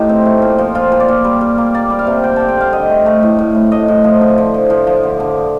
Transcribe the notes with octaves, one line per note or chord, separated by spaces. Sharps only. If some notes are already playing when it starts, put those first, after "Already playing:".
Already playing: A2 A3 D#4 F4 G4
C4
A3
A#2
F3
A#2 F4
A#2
D5
A#2
G3
G3
A#3
A#3 D5
G3
F5
C3
D3 G5
C4 A5
G5
D3 F5
D3 D#5
A3
A3
A2
A2
A2
A2 D#5
A2
F3
D3
F3
F3
F3
F3
D3
D3